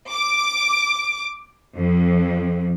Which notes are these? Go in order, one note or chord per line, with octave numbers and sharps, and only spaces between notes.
D6
F2